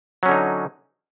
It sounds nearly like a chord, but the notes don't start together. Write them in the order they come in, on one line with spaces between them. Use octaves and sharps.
F#3 C#4 D3 D#4